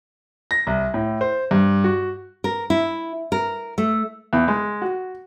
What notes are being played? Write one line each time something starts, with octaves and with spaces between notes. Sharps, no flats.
A#6
C2
A2
C5
G2
F#4
A#4
E4
A#4
A3
E2
G#3
F#4